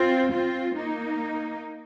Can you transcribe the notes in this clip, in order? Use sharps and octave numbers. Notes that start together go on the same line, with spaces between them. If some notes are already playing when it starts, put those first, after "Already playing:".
Already playing: C4 F4
C4 F4
A#3 D#4